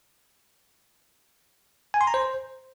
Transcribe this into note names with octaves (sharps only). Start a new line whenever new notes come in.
G#5
C6
A#5
C5